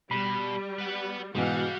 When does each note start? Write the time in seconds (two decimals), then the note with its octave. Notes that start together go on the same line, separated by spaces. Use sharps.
0.11 B2 G3 B5
0.78 B4 F#5
1.35 G#2 B2 E3 G3 F#4 F5 F#5